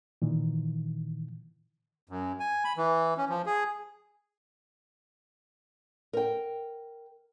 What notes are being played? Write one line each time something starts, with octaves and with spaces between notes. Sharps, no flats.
A#2 D#3 E3
F#2
G#5
B5
E3
C#4
F3
G#4
A#4 G5